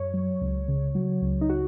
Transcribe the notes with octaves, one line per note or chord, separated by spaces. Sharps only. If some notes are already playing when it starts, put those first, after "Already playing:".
Already playing: F#2 C#5
F#3
C#2
C#3
F#3
C#2
D#4
F#4